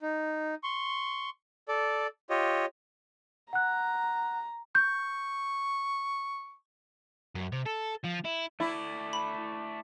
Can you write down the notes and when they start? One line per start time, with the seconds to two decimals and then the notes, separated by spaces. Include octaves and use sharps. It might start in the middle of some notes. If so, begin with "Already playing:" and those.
0.01 D#4
0.63 C6 C#6
1.68 A4 D5
2.30 F4 G4 C#5 D#5
3.53 F#5 A#5 F#6
4.75 C#6 G6
7.35 F#2
7.52 C3
7.66 A4
8.04 F3
8.25 E4
8.60 A3 E4 D5
9.13 B5